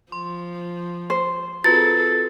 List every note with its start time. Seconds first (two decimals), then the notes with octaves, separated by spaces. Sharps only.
0.12 F3 C6
1.10 C5
1.64 C4 F4 F#4 G#4 A4 B4 A6